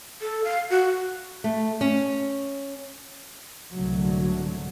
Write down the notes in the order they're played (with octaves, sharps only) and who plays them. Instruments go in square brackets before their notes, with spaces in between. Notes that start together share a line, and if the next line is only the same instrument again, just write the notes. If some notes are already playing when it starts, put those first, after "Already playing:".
[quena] A4
F5
F#4
[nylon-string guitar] A3
C#4
[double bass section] C2 G#2 D3 F#3 A3